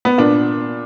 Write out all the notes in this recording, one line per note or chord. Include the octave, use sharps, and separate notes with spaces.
B3
A#2 D4